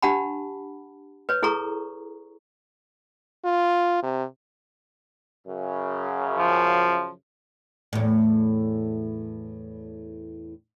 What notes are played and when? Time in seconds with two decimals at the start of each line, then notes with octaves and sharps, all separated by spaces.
0.02 D4 G4 F#5 A5 B5
1.29 B4 C#5
1.43 E4 G#4 A4 A#5 C#6
3.45 F4
4.03 C3
5.47 F#2 C#3
6.37 F3
7.93 E2 A2